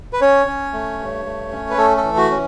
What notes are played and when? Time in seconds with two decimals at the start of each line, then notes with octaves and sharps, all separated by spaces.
0.13 B4
0.21 C#4 C#5
0.47 C#4
0.73 A3
0.99 G2
1.26 A3
1.51 C#4
1.70 B4
1.78 A3 A4
1.97 A4
2.04 E3
2.17 F#4
2.31 C#4